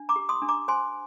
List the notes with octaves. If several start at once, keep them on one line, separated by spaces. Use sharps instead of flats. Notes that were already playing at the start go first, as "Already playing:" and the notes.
Already playing: D4
A#5 D6
G4
C6 D#6
D4
A#5 D6
C5 G#5 C6